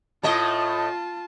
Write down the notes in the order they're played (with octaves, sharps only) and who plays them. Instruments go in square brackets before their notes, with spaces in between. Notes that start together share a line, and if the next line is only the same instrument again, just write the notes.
[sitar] A2 A3 D#5 [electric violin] F4 A5